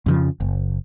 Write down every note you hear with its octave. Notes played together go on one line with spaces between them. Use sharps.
F2 C#3 F3
F#1